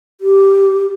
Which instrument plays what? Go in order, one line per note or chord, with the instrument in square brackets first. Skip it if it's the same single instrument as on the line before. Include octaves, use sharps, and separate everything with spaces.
[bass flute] G4